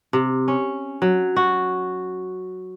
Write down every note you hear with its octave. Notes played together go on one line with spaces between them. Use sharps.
C3
C#4
F#3
F#4